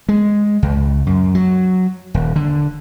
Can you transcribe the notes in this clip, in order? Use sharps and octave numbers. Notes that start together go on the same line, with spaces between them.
G#3
C#2
F#2
F#3
D#1
D3